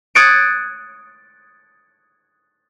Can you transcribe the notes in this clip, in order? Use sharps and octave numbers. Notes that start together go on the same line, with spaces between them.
D#6 F#6 G#6 A6 C#7 D7